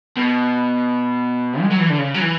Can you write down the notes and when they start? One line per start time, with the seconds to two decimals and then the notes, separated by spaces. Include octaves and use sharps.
0.17 B2
1.62 G#3
1.71 F#3
1.79 E3
1.90 D3
1.98 C#3
2.14 F#3
2.21 E3